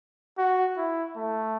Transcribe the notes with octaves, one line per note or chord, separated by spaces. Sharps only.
F#4
E4
A3